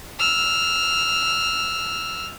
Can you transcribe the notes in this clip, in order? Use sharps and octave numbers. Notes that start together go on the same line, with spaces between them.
E6 F6